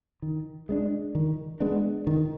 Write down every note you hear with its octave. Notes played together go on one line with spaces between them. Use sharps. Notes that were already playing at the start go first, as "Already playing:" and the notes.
D#3
G#3 B3 D4
D#3
G#3 B3 D4
D#3